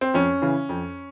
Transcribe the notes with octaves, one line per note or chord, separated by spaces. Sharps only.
C4
F2 C#4
C#3 E3
F2